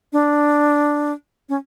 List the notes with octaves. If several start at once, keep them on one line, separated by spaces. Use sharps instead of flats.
D4
C#4